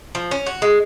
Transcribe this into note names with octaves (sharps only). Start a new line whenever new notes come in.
F3
C#4
F#4
G#3